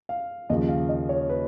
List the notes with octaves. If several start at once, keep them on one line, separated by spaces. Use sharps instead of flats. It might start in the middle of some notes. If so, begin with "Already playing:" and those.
F5
D#2 C#3 F3 D#5
F5
D#5
C#5
B4